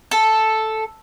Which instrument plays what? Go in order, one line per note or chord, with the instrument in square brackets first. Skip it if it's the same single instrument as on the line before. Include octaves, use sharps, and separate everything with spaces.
[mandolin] A4